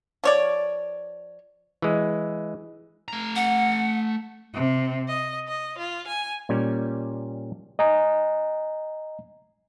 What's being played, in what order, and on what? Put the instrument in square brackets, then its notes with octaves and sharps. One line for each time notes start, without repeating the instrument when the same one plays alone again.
[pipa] F3 C#5 D5
[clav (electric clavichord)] E3 G#3
[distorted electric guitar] A3 A#5
[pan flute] F#5
[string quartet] C3
D#5
D#5
F4
G#5
[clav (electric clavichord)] A#2 G3 C#4
[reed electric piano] D#5 G#5 A#5